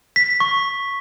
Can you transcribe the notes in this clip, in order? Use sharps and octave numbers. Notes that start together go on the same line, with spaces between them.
B6
C#6